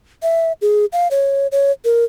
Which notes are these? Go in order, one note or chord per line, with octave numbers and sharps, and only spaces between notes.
E5
G#4
F5
C#5
C#5
A#4